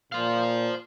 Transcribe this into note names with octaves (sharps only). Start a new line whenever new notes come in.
A#2 C5 F5